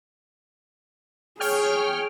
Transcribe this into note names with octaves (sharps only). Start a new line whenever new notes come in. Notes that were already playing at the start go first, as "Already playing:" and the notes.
G#4 C#5 G5 F6